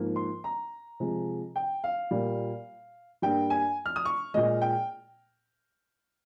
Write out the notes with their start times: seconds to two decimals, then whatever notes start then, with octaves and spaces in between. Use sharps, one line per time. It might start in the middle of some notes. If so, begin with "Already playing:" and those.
Already playing: G#2 F3 A#3
0.16 C6
0.44 A#5
1.00 C3 F3 G#3
1.56 G5
1.84 F5
2.11 A#2 G3 A#3
3.22 G2 G3 A#3 G5
3.50 G#5
3.86 F6
3.96 D#6
4.05 C#6
4.34 A#2 G#3 D#5
4.62 G5